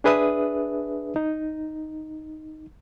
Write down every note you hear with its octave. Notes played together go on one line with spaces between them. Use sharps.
D4 G#4 B4 E5 D#6
D#4